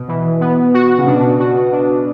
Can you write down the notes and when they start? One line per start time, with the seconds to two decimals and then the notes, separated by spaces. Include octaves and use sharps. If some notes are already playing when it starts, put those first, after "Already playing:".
Already playing: B2
0.08 E3
0.41 B3
0.74 F#4
0.98 C#3
1.07 B2 D4
1.39 F#4
1.72 D4